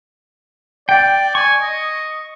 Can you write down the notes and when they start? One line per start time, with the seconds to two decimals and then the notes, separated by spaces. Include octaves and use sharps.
0.89 D5 G5
1.35 G#5 C#6
1.61 D#5